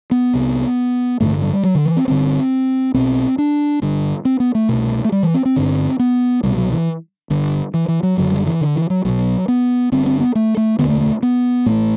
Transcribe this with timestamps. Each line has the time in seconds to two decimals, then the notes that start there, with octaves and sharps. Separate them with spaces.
0.11 B3
0.33 C2 C3
1.20 A1 G2 D3 A3
1.42 G3
1.53 G3
1.63 F#3
1.75 D3
1.86 E3
1.97 C4
2.07 G1 G2 D3 C4
2.94 B1 B2 C4
3.38 D4
3.82 G1 G2 D3
4.25 C4
4.40 B3
4.55 A3
4.69 C2 B2
5.05 A3
5.12 G3
5.23 E3
5.34 C4
5.45 C4
5.56 G1 G2 D3
5.99 B3
6.43 C2 B2 G3
6.58 F#3
6.72 E3
7.30 G1 G2 D3
7.74 E3
7.88 E3
8.03 F#3
8.17 F#1 F#2 D3 F#3
8.32 G3
8.46 E3
8.61 D3
8.76 E3
8.90 F#3
9.05 B1 B2 F#3
9.48 B3
9.92 G1 G2 D3 C4
10.06 C4
10.20 B3
10.35 A3
10.57 A3
10.79 E1 D2 D3 B3
10.89 A3
11.01 A3
11.23 B3
11.66 A1 A2 A3